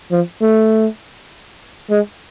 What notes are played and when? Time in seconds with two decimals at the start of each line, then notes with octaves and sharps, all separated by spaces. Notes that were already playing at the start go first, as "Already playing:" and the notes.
0.12 F3
0.42 A3
1.90 G#3